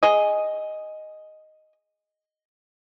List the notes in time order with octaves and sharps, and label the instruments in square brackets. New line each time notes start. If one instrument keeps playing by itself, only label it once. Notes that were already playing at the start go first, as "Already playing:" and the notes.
[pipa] G#4 D#5